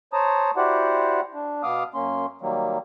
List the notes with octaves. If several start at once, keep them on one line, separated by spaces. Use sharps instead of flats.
C5 C#5 A5 A#5 D#6
E4 F#4 G4 C5 D5 F#5
D4
B2 B3 F5 D6 D#6 F6
F#2 A#3 C#4 C6
D#3 F#3 G3 A#3